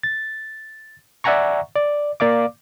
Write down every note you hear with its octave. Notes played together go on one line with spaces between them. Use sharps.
A6
D5 E5 F#5 G#5 A#5 C#6
D5
A#3 D5 F5 D6